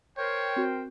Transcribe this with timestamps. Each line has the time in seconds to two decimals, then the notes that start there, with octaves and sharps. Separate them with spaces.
0.17 A#4 C5 C#5 G5
0.56 C4 F#4